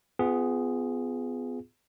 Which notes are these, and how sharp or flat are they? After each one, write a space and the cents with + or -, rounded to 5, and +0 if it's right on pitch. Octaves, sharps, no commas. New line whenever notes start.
B3 +30 F4 -10 G#4 +0